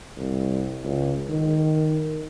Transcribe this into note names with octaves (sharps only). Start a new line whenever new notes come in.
C2
C#2
D#3